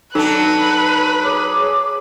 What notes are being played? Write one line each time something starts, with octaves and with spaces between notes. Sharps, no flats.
F#3 D4 D#4 A4 B4
G#4 C#5 D6